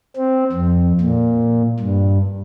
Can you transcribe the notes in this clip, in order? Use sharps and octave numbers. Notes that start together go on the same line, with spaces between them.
C4
F2
A#2
G2